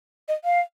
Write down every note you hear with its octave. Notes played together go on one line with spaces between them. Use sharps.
D#5
F5